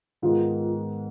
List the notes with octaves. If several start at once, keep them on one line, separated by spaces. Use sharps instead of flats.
G#2 D#3 G#3 B3 F4